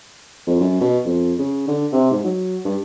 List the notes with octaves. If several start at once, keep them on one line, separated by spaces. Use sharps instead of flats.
F2
F#2
B2
F2
C#3
D3
C3
G#2
F#3
G2